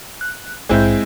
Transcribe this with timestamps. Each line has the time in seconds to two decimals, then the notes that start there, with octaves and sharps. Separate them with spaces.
0.21 F#6
0.69 A#1 G#2 G#3 C4 E4 G6